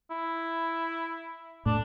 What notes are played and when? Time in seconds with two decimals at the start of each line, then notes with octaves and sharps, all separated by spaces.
0.11 E4
1.66 A2 D4